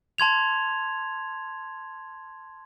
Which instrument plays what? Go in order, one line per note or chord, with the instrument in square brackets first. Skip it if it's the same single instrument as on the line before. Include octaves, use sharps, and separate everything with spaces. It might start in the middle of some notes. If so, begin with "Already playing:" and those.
[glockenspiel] A5 C6 G#6 F7